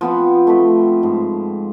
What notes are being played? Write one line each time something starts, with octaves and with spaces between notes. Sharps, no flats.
F3 B3 C4
A3 C4 B5
G#2